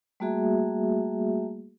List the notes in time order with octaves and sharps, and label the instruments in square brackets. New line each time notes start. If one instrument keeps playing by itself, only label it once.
[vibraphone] G3 A3 A#3 F#4 G#4 E5